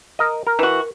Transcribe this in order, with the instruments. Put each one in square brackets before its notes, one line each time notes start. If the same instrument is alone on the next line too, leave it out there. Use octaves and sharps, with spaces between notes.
[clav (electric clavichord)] A#4 D#5
A#4
[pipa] E3 F#4